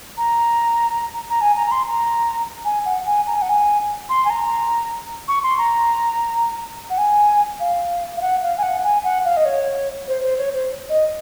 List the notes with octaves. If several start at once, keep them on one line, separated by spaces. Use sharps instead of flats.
A#5
A#5
G#5
A#5
A#5
C6
A#5
G#5
F#5
G#5
A#5
G#5
F#5
G#5
C6
G#5
A#5
C#6
C6
A#5
F#5
G#5
F5
F5
F#5
F5
G#5
F#5
G#5
F#5
F5
D#5
C#5
C5
C5
C#5
C5
D#5